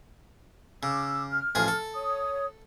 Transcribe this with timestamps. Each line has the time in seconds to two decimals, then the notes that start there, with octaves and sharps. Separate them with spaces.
0.83 C#3 D6 E6
1.30 F6
1.55 A1 F3 G#4
1.68 A4
1.95 C#5 D#6